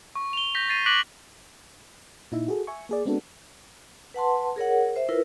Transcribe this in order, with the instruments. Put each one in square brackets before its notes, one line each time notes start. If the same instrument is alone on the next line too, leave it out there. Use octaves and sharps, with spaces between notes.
[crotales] C#6
F7 G7
G6 A#6 B6
A6 C7 D#7
D6 F#6 A#6 B6 D7 F#7
[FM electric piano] A#2 D#4 E4 E5
F#4 G#4 A4
E5 G#5 C#6
A#3 G#4 D5
G#3 B3 C4 D4 F#4 A4
[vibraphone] B4 F#5 A5 C6
G#4 A#4 C#5 F#5
C5 E5
E4 F4 A#4 B4